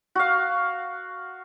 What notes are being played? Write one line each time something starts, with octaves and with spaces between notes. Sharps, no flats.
F#4 F5